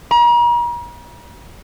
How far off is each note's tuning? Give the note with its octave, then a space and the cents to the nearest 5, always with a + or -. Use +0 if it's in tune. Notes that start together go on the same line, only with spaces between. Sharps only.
A#5 +40